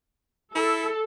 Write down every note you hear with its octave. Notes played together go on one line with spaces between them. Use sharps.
E4 A4